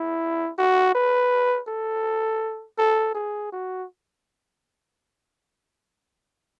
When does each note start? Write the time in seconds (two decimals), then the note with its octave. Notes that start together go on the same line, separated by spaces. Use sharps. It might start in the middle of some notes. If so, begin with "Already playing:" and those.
Already playing: E4
0.58 F#4
0.95 B4
1.68 A4
2.78 A4
3.15 G#4
3.52 F#4